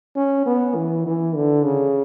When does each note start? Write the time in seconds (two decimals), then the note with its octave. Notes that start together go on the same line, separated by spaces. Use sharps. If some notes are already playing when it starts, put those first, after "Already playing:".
0.17 C#4
0.46 B3
0.76 E3
1.06 E3
1.35 D3
1.64 C#3